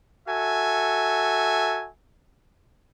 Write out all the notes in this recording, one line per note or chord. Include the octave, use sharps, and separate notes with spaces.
F#4 A4 E5 G#5